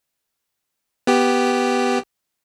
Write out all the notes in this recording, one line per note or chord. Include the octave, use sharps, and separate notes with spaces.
B3 G4